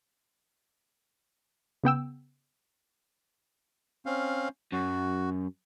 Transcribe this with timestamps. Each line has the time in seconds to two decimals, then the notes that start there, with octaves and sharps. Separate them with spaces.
1.83 C#3 B3 G5 E6
4.06 C4 C#4 F5
4.72 F#2 F#4